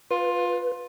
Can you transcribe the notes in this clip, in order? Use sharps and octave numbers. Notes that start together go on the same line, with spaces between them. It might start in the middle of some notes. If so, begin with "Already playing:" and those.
F4 B4